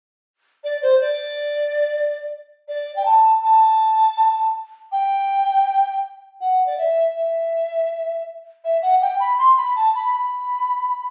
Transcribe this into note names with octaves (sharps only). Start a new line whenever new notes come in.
D5
C5
D5
D5
G5
A5
A5
G5
F#5
D5
E5
E5
E5
F#5
G5
B5
C6
B5
A5
B5
B5